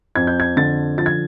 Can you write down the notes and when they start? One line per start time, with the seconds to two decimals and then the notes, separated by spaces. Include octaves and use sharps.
0.15 F2 G#6
0.27 G6
0.40 G#6
0.57 D3 A6
0.98 F3 A6
1.06 G#6